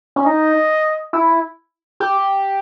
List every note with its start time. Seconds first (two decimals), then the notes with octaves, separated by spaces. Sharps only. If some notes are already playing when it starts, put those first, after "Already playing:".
0.16 C#4
0.26 D#4 D#5
1.13 E4
2.00 G4